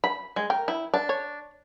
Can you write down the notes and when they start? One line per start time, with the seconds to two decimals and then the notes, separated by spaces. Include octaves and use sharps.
0.04 B5
0.36 G#3
0.50 A#4 G5
0.68 E4
0.94 D4
1.09 C#5